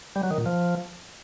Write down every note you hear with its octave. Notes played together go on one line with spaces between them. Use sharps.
G3
F#3
D#3
A#2
F3